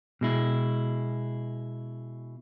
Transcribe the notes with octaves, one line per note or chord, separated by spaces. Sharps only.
B2 G#3 E4